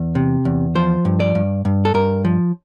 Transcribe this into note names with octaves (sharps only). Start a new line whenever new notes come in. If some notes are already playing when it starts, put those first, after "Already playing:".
Already playing: E2
C3
E2
F3 C5
G2
D5
G2
G2
A4
G2 A#4
F3